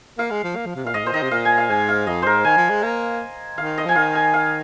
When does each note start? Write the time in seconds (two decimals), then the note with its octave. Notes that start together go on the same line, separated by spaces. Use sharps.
0.18 A#3 F5
0.31 G#3
0.44 F3
0.56 A#3
0.66 F3
0.76 C3
0.85 A#2 F5
0.94 G#2 D#5
1.04 A#2 C5
1.13 D#3 D#5
1.23 C3
1.31 A#2 F5
1.45 G#5
1.58 F5
1.69 G#2 G#5
1.88 F5
2.07 F2 D#5
2.22 G#2 A#4 C5
2.45 D#3 G#5
2.58 F3
2.70 G#3
2.83 A#3
3.58 D#3 F5
3.78 D#5
3.85 F3 G#5
3.95 D#3 F5
4.15 G#5
4.34 F5